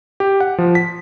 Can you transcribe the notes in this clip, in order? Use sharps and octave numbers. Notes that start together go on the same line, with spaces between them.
G4
F#5
F3
B6